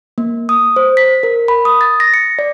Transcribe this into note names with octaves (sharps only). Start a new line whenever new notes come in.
A#3
D#6
C5
B6
A#4
B5
D#6
A6
A#6
C#7
D5